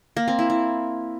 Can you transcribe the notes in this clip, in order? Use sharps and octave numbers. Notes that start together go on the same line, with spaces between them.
A#3
C4
E4
E4